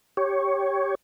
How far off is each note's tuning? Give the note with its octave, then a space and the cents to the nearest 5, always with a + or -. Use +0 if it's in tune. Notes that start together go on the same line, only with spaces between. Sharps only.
G4 +0 C#5 +0